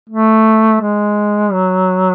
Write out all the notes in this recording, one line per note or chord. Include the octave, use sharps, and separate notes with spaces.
A3
G#3
F#3